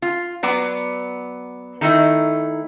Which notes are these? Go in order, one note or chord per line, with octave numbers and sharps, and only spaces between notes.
F4
F#3 B3 D5
D#3 A3 D#4 E4